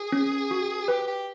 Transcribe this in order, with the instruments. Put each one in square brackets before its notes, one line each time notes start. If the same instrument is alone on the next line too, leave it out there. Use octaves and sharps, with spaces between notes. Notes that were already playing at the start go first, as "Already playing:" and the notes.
Already playing: [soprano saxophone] G#4
[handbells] C#4
F#4
[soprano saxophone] G4 [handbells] B4
[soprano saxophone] G4